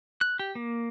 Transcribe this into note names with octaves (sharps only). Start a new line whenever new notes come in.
F#6
G4
A#3